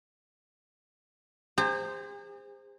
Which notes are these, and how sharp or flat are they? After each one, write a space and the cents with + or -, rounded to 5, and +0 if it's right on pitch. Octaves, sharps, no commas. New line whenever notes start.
G#4 -45 C5 +0 A#5 -45